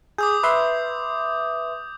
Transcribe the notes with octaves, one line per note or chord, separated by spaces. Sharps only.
G#4 D6 D#6 G6
B4 E5 C6